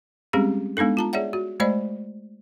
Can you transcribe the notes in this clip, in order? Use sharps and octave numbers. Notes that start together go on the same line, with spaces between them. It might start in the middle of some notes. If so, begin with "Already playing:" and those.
G3 G#3 C4 C#4 G4 G#4
G#3 B3 D4 D#4 A4
F4 A5 A#5
G#4 C#5 D5 E5 F#5
F#4
G#3 A3 C5 D5 D#5 B5